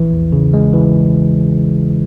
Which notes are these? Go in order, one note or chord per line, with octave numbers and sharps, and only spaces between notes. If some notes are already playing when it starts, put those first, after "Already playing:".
Already playing: A#1 E3
E2
C#3
G#3
E3